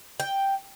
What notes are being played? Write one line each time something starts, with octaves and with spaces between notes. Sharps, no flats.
G5